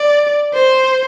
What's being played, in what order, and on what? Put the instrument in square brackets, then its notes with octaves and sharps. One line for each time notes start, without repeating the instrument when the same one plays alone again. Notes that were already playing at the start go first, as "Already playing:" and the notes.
Already playing: [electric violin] D5
C5